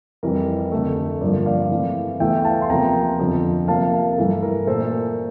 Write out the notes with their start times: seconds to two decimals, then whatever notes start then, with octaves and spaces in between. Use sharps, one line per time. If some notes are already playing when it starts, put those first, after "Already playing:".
0.23 F2 E3 G3 A#4
0.72 F2 D3 A3
1.21 G2 D3 F3 A#3 A#4 D5
1.46 D5 F5
1.71 C3 E3 A3
2.20 E2 E3 A3 E5 G5
2.45 F5 A5
2.62 C6
2.70 E2 C3 F3 A#3 G5 A#5
3.19 F2 D3 F3
3.68 C3 F3 A#3 F5 A5
3.93 A#4
4.18 G2 E3 A3 A4
4.43 A#4
4.67 A#2 A3 A4 C5
4.92 A#4